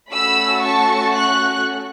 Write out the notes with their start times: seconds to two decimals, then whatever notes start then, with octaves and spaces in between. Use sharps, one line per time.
0.11 A3 C#4 F#4 A4 B5 E6
0.62 A5 C#6
1.13 C#6 F#6